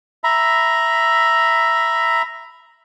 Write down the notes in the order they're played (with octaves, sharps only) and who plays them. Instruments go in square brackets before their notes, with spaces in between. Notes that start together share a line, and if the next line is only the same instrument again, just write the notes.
[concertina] E5 A#5 B5